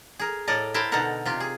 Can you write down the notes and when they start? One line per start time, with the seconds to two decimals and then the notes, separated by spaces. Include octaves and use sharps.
0.19 G#4 A#4
0.48 A2 A4 A#4 D5 D#5
0.74 E4 A#4 C5 G5 A5
0.92 B2 D3 D#4 A4 A#4 F#5
1.25 C3 F4 G4
1.40 G#4